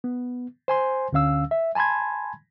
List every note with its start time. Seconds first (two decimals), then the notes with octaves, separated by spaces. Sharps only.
0.04 B3
0.68 C5 G#5 C6
1.12 D2 D3 C#4 F5 E6
1.51 E5
1.75 G#5 A5 B5 C6 G#6